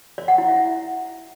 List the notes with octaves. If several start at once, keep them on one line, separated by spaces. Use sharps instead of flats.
D5
F#5
E4
E5